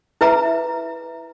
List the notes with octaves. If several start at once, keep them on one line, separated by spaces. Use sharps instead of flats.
E4 B4 E5 A#5